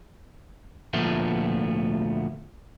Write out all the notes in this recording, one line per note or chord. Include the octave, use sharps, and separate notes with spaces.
D2 A#2 F3 A3 B3